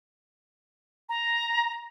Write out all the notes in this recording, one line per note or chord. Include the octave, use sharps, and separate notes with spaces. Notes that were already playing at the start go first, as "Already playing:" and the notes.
A#5